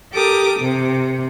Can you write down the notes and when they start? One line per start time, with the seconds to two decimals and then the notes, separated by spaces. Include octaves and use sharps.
0.12 G4 A4 A#4 D6 D#6
0.58 C3